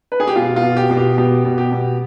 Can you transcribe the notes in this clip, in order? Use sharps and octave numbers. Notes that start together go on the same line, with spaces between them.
B4
G#4
G4
B2 F4
F4
B2
G4
B2
G4
B2 G4
B2
G4
B2